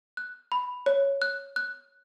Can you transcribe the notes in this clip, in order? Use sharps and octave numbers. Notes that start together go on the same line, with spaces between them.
F#6
B5
C#5
F#6
F#6